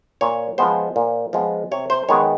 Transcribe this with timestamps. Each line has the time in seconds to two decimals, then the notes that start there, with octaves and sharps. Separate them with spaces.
0.21 A#2 C#5
0.58 F3 G#3 B3 C5
0.96 A#2
1.33 F3 G#3 B3
1.71 C3 C#5
1.90 C5
2.09 D#3 G#3 B3 C#5